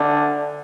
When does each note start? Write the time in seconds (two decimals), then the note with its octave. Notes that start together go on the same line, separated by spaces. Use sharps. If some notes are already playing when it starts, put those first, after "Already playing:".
Already playing: D3